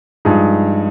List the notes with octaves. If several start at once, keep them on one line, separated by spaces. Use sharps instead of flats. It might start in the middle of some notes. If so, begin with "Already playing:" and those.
G2 F3 G#3 D#4 G#4